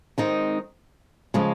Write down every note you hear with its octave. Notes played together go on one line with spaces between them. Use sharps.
D#3 G#3 C4 D#4
C#3 F3 G#3